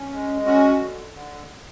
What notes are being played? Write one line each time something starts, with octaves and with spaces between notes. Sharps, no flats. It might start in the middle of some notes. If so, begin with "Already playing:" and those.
Already playing: C#4
G#3
C#4 F#4
D3
D3